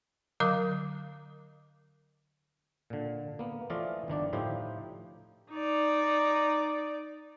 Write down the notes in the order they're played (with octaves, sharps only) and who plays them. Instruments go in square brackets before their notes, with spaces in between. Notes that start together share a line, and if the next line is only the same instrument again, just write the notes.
[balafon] D3 F#3 A#4 F5 D6
[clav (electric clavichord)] A#2 D3
A#3 B3
E3 F3 A3 F4 D5 D#5
G1 D#3 D4 D5
A2 F3 D#4 E4 G4 C5
[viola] D#4 D5